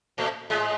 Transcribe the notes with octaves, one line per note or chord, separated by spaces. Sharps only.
A2 A3
G#2 G#3